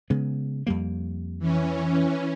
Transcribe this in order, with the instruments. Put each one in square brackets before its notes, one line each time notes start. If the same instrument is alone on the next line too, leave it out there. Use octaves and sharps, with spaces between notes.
[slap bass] C#3 G#3 B3
F2 G3 A#3
[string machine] E3 C#4